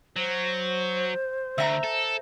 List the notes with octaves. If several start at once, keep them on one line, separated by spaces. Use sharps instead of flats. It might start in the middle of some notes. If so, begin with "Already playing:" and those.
F#3 C5
D2 E5 A#5
A4